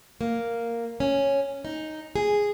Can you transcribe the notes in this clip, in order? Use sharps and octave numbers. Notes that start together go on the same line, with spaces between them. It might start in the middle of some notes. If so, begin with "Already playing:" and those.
A#3
C#4
D#4
G#4